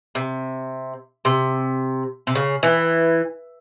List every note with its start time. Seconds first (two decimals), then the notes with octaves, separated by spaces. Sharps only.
0.15 C3
1.25 C3
2.27 C3
2.35 C#3
2.63 E3